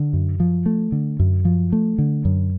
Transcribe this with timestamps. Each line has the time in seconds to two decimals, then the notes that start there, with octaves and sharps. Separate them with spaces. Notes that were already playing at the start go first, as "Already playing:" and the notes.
Already playing: D3
0.13 F#2
0.40 F3
0.66 A3
0.92 D3
1.20 F#2
1.45 F3
1.72 A3
1.98 D3
2.25 F#2